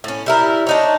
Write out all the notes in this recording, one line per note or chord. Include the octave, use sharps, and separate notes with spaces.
A2 C#4
G3 E4 A#4
D4 D#4 C#5